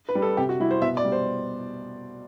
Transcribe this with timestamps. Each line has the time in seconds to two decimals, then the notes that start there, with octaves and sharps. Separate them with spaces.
0.09 B4
0.15 G3
0.22 A4
0.37 C3 G4
0.49 F#4
0.60 G3 E4
0.71 C5
0.82 B2 E5
0.97 D5
1.05 G3
1.12 C5